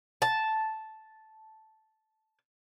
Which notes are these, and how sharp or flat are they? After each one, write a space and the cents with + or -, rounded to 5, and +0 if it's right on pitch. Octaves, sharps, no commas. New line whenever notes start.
A5 -5